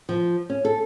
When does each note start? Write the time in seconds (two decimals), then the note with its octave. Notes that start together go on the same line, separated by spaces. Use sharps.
0.09 F3
0.50 C#4
0.65 A4